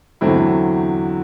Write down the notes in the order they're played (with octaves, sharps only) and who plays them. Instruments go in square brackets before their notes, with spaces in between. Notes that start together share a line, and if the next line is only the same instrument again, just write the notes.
[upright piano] E2 D3 F#3 A3 C4 E4